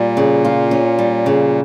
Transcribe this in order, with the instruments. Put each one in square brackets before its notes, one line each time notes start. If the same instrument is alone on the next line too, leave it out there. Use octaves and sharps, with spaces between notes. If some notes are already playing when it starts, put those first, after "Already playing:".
Already playing: [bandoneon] A#2 [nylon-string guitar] G3
[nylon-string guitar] C#3
F4
C#4
G3
C#3